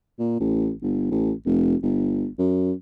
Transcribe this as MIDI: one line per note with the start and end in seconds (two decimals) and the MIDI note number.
0.19 0.39 46
0.40 0.72 33
0.82 1.07 31
1.11 1.32 33
1.46 1.75 29
1.83 2.27 31
2.39 2.72 42